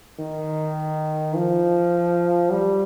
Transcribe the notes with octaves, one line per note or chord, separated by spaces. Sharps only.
D#3
F3
G3